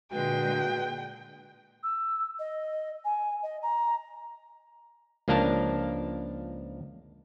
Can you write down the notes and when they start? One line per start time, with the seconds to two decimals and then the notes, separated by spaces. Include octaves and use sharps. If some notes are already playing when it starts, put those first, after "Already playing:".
0.12 A#2 D3 G#3 F#4 B4 G5
1.83 E6
2.39 D#5
3.05 G#5
3.43 D#5
3.63 A#5
5.28 C#2 F3 A#3 D4 A#4 A5